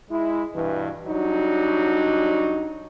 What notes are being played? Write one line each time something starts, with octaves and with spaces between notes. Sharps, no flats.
G#3 E4
G2 B2 E3
F#3 G3 D4 D#4 F#4